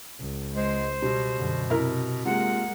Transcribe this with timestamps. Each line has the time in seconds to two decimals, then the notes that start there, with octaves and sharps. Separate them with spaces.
0.20 C#2
0.55 G#3 C5
1.02 B2 G3
1.38 F#2 D3
1.70 C3 E4 A#4
2.25 C3 G#3 A#3 F4 F#5